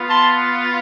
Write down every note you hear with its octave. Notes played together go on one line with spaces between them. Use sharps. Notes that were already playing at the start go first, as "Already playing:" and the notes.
Already playing: B3 F4
A5 C6